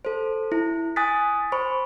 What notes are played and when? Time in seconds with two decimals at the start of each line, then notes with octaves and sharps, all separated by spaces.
0.05 A4 C5
0.52 E4
0.96 G#5 D#6 F#6 A6 B6
1.52 C5 B5 C#6